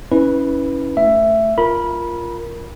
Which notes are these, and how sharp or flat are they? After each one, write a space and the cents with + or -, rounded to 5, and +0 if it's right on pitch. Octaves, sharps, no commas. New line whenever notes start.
C#4 +0 E4 -30 B4 +0
A3 +0 E5 +10
F4 -5 A#4 +0 B5 -20